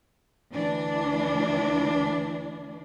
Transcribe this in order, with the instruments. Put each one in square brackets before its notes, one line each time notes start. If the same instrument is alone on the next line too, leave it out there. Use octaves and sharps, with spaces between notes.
[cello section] D2 E3 D4